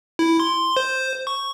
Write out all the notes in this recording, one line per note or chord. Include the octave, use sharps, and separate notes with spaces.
E4
C6
C5
C#6